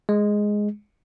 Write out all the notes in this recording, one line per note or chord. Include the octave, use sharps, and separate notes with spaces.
G#3